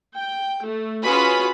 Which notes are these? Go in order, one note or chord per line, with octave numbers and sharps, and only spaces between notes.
G5
A3
C#4 F4 F#4 G#4 B4 B5